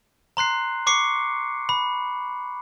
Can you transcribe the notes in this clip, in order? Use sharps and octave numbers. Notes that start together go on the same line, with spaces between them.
A#5 C6 F#6 C7
C#6 D6 C7 C#7
B5